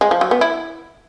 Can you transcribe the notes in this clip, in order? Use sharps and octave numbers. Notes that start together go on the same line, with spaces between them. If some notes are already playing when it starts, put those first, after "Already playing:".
G#3
F3
F#3
B3
E4